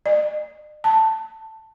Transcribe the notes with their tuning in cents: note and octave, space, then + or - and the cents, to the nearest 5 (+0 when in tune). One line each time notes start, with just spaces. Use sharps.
D5 +45
A5 +10